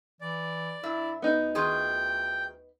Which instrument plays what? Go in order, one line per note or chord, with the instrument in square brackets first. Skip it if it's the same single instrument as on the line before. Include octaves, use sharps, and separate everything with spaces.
[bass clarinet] E3 [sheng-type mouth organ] D5
[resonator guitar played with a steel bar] G2 E5 [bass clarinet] E4
[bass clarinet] D2 [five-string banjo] B3 D#4
[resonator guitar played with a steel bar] D#3 F4 G#4 [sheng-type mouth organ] G5